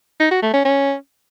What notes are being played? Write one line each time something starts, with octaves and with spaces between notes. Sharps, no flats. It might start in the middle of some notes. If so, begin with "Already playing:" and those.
D#4
F#4
A3
C#4
C#4